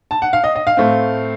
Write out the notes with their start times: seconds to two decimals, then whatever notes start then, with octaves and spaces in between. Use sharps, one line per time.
0.11 A5
0.22 F#5
0.33 F5
0.44 D#5
0.56 D#5
0.67 F5
0.77 A2 A3 C4